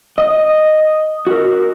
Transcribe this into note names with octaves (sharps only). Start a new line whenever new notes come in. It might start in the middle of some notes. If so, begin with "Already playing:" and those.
D#5
F#4 A#4